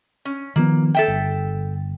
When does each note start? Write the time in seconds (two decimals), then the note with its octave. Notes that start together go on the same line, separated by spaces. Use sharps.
0.25 C#4
0.56 D#3 F3 A#3 B3
0.95 A4 E5 G5
1.08 G1